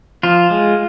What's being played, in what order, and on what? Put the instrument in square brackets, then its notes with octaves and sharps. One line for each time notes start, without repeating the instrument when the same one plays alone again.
[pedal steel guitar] F3 F4
G#3